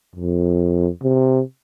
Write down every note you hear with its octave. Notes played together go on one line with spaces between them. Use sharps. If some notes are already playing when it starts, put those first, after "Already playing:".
F2
C3